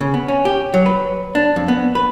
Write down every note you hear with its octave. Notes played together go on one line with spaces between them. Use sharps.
C#3
B3
C#4
G4
F#3
B4
D4
F2
B3
B4